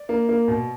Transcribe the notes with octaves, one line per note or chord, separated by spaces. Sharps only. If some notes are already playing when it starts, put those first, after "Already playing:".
Already playing: D5
A#3
A#3
B2